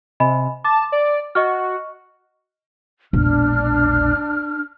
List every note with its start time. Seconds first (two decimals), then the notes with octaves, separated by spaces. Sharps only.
0.20 C3 D#5 G#5 B5
0.64 A5 D6
0.92 D5
1.35 F#4 D#5 C#6 F6
3.13 E1 A#1 D4 F6